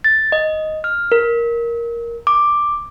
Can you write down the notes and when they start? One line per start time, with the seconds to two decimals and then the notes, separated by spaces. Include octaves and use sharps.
0.04 A6
0.32 D#5
0.84 F6
1.12 A#4
2.27 D6